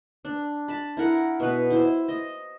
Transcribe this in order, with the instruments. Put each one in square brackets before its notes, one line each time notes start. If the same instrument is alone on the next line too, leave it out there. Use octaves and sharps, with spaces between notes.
[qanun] D4
A5 B5
E4 A#4 F#5
B2 B4
E4 C5
D#5